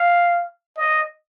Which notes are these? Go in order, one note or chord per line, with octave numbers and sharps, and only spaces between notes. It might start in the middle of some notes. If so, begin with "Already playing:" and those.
Already playing: F5
D#5